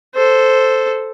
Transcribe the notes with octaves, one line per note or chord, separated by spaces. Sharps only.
A4 C5